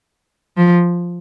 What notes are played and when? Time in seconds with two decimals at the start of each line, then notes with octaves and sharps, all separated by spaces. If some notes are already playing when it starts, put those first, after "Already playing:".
0.57 F3